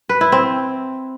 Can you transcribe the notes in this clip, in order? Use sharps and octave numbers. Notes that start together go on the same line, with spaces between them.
B4
E4
C4